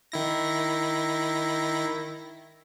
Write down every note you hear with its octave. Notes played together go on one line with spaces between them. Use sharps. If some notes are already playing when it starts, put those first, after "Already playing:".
D#3 E4 A#6